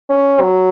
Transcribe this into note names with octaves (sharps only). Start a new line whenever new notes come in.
C#4
F#3